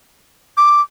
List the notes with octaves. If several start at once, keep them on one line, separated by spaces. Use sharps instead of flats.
D6